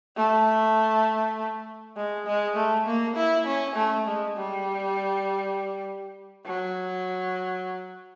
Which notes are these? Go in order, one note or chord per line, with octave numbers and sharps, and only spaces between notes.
A3
G#3
G#3
A3
A#3
E4
C#4
A3
G#3
G3
F#3